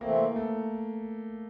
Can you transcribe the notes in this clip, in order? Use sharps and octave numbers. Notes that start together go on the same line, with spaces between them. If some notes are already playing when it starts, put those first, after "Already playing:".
C3 E3 A3 A#3 C4
A3